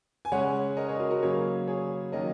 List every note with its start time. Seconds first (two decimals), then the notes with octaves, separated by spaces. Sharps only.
0.25 G#5
0.32 C#3 G#3 C#4 C#5 F#5
0.77 A#4 D#5
0.88 G#4 C#5
1.00 F#4 A#4
1.11 F#4 A#4
1.22 C#3 F#3 A#3 G#4 C#5
1.67 G#4 C#5
2.12 D#3 F#3 A#3 C#4 A#4 D#5